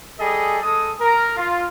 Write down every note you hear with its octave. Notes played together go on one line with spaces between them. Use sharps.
G3 G#4 A4 D#5
G#3 A4 D#6
A#4
F4